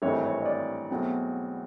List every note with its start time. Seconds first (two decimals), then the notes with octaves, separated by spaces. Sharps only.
0.02 G#1 G2 E3 A3 C4 C#5
0.25 C#5
0.41 D#5
0.46 D5
0.90 E2 B2 F#3 A3 C4